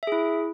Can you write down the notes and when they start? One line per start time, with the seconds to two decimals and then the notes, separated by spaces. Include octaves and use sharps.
0.03 E5
0.07 G#4
0.12 E4